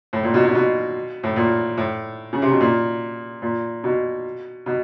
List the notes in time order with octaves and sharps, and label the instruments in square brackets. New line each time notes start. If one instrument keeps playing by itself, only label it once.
[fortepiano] A2
A#2
B2
B2
B2
A2
A#2
A2
C#3
C3
B2
A#2
A#2
B2
B2